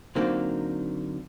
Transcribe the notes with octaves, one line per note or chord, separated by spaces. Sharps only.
D3 F#3 A#3 C4 D4 D#4